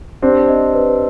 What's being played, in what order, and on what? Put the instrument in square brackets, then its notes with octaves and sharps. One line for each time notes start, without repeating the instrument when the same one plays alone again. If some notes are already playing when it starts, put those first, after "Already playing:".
[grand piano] C4 D4 [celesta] G4
[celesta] D#5
B4